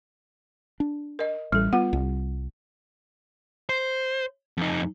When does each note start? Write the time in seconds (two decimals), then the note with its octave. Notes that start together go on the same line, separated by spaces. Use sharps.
0.80 D4
1.19 A#4 D#5
1.52 A1 G3 A4
1.73 B3 F4 F#5
1.93 C2
3.69 C5
4.57 F2 D#4